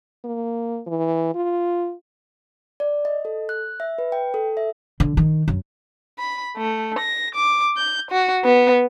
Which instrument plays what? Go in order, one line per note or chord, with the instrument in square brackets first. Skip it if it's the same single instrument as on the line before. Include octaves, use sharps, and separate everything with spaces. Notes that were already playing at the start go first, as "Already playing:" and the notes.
[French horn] A#3
E3
F4
[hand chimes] D5
D#5
A4
F#6
E5
B4
G5
A4
E5
[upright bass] D3
D#3
F#2
[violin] B5
A3
A#6
D6
G6
F#4
B3